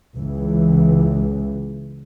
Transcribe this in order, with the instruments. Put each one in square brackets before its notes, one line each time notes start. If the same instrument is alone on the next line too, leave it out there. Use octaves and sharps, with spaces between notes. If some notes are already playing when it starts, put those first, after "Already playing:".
[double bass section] C#2 E3